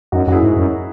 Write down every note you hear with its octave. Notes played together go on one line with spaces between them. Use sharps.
F#2 D#4 F#4
F#2 E4 F#4 G#4
G#2
F#2